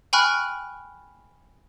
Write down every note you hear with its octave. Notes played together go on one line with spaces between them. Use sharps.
G5 G#5 B5 C#6 F6 F#6